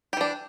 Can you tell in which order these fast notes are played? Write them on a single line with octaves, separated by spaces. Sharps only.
G4 E3 D4